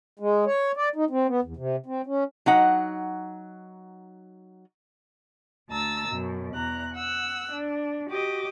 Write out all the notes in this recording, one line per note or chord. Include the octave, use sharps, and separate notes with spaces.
G#3
C#5
D5
D#4
C4
B3
E2
C3
C4
C#4
F#3 D#4 F#5
D2 A5 A#5 E6 A6
F#2 B2
E2 A#5 F#6
F#5 E6 F#6
D4
F#4 G4 D#5 D6